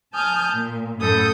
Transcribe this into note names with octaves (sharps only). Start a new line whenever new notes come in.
G#5 A5 D#6 F6 G6
A#2
F#2 A2 A4 D#6 G6